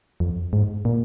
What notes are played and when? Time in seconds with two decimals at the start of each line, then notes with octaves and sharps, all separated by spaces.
0.20 F2
0.53 G#2
0.85 A#2